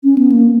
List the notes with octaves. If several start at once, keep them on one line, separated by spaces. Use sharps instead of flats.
C#4
B3
A#3